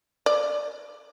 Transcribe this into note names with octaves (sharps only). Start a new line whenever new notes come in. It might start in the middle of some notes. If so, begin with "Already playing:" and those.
D5